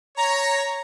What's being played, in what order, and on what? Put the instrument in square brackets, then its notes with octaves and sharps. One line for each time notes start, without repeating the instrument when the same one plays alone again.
[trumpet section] C#5 [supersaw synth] A#5